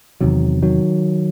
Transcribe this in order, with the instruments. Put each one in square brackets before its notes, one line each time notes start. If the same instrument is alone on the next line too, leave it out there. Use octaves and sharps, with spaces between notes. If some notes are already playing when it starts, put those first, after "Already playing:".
[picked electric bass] E2 C3 D#3 F#3
D#3 F#3